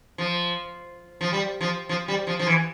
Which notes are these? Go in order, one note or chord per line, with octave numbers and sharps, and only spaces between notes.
F3
F3
G3
F3
F3
G3
F3
F3
E3